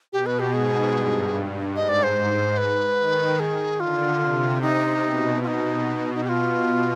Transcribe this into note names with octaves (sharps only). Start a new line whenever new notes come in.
B2 G4
B4
G4
G#2 G#4
G2
G#2 D#5
D5
C5
B4
D#3
G#4
D3 F4
C3
D#4
B2
F4
D#4
D#4
G4
F4